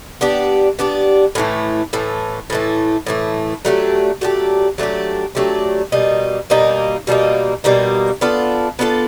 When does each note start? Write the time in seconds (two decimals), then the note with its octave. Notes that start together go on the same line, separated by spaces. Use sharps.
0.21 B3 D4 G4
0.79 B3 D4 G4
1.35 A2 E3 A3
1.93 A2 E3 A3
2.50 A2 E3 A3
3.06 A2 E3 A3
3.65 F#3 A3 D4 G4
4.21 F#3 A3 D4 G4
4.78 F#3 A3 D4 G4
5.35 F#3 A3 D4 G4
5.92 B2 G3 A#3 D#4
6.50 B2 G3 A#3 D#4
7.07 B2 G3 A#3 D#4
7.64 B2 G3 A#3 D#4
8.21 B3 D4 F4 A4
8.79 B3 D4 F4 A4